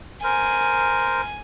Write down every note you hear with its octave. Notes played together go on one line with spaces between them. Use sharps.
A#4 C5 G#5